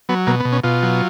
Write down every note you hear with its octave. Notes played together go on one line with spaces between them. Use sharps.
F#3 B3
B2 A#3
B3
B2
C#4
B2 F4
F#3